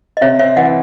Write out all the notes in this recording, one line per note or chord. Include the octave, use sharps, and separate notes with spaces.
D#5
C3 C#5 E5
C4 C#5 E5
E3 D#5 F#5